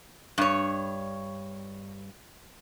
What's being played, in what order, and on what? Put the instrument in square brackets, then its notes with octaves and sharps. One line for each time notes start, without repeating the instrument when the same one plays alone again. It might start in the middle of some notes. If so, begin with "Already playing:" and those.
[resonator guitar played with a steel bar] G2 C#5